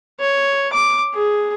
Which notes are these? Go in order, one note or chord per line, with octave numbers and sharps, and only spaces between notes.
C#5
D6
G#4